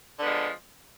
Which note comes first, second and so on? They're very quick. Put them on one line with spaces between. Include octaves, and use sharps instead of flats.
D3 B3 F3 G#3